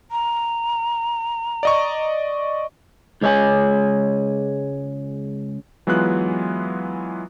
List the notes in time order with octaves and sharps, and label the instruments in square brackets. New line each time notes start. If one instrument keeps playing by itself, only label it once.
[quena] A#5
[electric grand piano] D5 D#5 C#6
[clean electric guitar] C#2 G#3 C#5 D5 G#5
[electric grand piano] E3 F#3 G#3 B3 F4 F#6